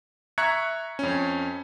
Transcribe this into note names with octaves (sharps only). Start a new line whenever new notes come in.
E5 A#5 C#6 F#6 G#6 C#7
F2 C#4